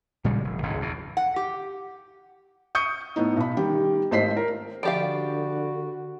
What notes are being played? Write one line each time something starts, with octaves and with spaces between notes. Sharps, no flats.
A#2 C#3 G3 G#3
F1
G#1 C#2 A2
E2 B2
F#5
G4
C#6 D#6 G6 C#7
A2 B3 D#4
B1 B5
D#3 G3 G4
G#1 A3 C5 D#5 B6 C7
A#4
D3 F3 F#4 G4 D5 F5 B5 D7